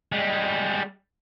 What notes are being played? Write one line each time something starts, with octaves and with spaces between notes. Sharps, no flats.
G3 G#3